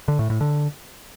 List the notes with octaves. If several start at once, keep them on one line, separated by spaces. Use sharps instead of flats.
D3
A2
A2
D3